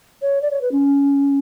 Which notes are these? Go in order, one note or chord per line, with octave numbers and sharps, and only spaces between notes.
C#5
D5
C#5
B4
C#4